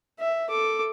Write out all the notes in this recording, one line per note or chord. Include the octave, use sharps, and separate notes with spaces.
E5
A4 D6